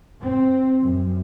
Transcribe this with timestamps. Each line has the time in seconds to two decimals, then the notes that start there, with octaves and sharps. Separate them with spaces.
0.21 C4
0.79 F#2